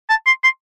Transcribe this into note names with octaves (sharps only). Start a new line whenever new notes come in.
A5
C6
C6